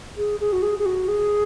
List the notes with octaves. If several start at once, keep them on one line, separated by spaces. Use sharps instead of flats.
G#4
G#4
F#4
G#4
G#4
F#4
G#4